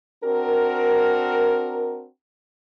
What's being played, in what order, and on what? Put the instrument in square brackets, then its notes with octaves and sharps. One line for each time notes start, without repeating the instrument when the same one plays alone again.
[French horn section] C4 D4 F#4 A#4